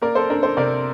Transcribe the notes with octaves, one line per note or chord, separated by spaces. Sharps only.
A#3 A#4 D5
A4 C5
D4 A#4
A4 C5
C3 A#4 D5